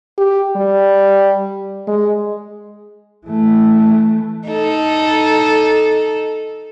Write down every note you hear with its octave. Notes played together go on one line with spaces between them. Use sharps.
G4
G3
G#3
E3 A3
D#4 A4